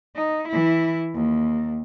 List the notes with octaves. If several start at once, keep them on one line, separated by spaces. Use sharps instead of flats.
D#4
E3 E4
D#2